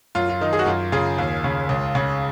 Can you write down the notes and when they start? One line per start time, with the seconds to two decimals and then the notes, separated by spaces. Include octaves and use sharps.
0.15 F#2 F4
0.29 F4
0.41 D#3 D#4
0.53 G#4
0.59 F#4
0.66 F#2 F4
0.92 C#3 F4 G#4
1.18 D#2
1.44 C#3
1.69 C#2
1.95 C#3